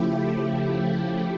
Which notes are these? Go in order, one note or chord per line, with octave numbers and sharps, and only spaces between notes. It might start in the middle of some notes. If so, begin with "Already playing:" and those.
Already playing: C#3 F3 A3 E4 G4